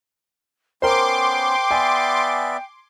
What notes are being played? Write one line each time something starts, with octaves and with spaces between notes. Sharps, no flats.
B3 C#4 A#4 C5 G5 C6 D6
B3 D5 E5 G#5